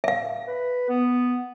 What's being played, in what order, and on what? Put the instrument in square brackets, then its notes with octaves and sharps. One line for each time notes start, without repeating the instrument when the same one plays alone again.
[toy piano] E5 F5
[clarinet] B4
B3